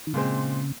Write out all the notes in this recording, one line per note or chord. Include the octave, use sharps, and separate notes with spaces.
D#3
A#2 C#3 G#3 C4